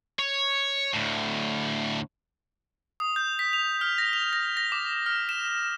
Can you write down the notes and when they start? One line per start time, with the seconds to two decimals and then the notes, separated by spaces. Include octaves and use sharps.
0.19 C#5
0.94 D2 A2
3.00 D#6
3.16 G6
3.39 B6
3.53 F7
3.81 F6
3.98 A#6
4.13 F7
4.33 A#6
4.57 A#6
4.72 D6
5.06 F6
5.29 E7